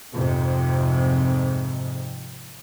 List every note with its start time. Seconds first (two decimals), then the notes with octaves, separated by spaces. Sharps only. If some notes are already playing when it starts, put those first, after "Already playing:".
0.15 F2 G#2 C3